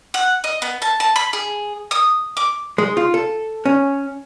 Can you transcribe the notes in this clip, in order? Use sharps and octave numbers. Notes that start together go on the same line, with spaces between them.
F#5
D#5
B3
A5
A5
B5
G#4
D#6
D6
G#3
F4
A4
C#4